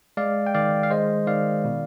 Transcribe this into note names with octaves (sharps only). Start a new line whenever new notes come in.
G#3 D5 F5
G5
D#3 D5 F5
F5
G#3 C5 D#5
D#3 D5 F5
B2